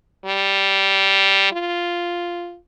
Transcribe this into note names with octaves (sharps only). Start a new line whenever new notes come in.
G3
F4